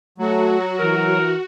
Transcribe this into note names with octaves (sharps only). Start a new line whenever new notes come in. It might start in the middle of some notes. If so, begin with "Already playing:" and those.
F#3 A3 F#4
E3 A#4